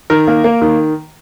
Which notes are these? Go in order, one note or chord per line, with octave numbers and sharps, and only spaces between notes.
D#3 A#4
A#3
A#3
D#3